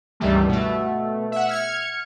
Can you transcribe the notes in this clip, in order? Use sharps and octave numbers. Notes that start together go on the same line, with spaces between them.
C#2 G2 D#3 E3 G3 A3
B2 A3
E5 F#5
F6 G#6 C#7